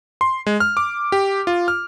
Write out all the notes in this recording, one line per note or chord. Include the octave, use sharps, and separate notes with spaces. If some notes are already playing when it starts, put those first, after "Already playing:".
C6
G#3
F6
D6
G4
F4
F6